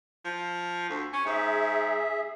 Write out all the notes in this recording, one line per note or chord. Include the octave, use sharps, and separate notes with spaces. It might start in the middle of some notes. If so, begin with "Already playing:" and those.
F3
D2
C#4
G#2 G#4 E5